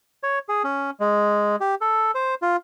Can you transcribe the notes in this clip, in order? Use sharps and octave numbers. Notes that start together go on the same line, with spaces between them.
C#5
G#4
C#4
G#3
G4
A4
C5
F4